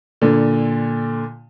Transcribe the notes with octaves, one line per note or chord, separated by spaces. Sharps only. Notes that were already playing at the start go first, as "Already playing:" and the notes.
A#2 D3